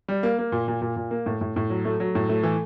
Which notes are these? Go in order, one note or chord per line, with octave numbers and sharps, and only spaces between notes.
G3
A#3
A#3
A#2
A#2
A#2
A#2
A#3
A2
A2
A2
F#3
A3
F#3
A2
A3
E3